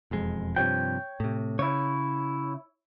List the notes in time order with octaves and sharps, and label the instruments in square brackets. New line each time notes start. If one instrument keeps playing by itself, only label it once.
[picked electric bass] E1 F2 G#3
[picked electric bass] G2 C3 F3 [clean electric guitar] C#5 G5
[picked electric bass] A2 C3
[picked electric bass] C#3 [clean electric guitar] E4 C#5